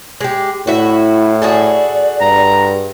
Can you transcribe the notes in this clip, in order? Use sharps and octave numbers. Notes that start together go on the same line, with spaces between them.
G#3 G4
A2 E4 F#4 E5
F#4 G#4 A4 D5
G2 A#5